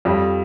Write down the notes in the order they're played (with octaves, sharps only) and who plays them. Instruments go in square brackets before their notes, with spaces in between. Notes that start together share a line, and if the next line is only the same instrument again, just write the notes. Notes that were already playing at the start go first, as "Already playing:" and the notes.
[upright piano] F2 [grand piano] G3